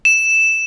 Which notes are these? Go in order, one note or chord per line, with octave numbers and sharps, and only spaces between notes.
E7